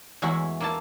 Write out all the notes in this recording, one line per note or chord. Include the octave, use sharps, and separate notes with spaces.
E2 G#3 E4 F#4 E5
A#3 E4 A5